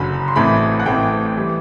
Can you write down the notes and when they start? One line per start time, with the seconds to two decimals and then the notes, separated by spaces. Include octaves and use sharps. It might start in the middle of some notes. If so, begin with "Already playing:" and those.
Already playing: F#1 F#2 D3 B5
0.28 C6
0.36 A1 A2 E3 A3 C4 B5
0.80 F#5
0.86 A1 A2 E3 A3 C4 G5
1.37 E3 G3